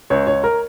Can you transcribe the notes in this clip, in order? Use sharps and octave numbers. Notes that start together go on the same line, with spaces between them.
C#2 C#5
C#2 C#5
A#4